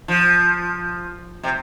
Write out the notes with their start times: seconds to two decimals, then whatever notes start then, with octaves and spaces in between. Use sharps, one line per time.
0.08 F3
1.43 C3